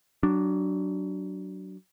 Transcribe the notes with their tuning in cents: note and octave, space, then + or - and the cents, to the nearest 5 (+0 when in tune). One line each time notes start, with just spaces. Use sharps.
F#3 +20 D4 +0